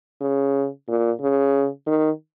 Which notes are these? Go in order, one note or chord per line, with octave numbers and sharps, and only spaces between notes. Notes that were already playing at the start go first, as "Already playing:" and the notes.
C#3
A#2
C#3
D#3